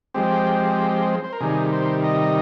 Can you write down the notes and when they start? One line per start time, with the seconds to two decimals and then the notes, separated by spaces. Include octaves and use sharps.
0.14 F3 G#3 C4 G4
1.24 C5
1.33 A#4
1.41 C3 D#3 G3 G#4
1.73 C5
2.04 D#5